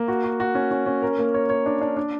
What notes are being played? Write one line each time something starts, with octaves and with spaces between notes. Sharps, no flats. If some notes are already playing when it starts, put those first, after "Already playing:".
Already playing: A#3
F#4
F#4
F#4
C#4
C#4
C#4
A#4
A#3
C#5
C#5
D4
D4
D4